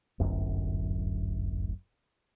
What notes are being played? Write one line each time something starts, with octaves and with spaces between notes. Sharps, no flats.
D1 G1 F#2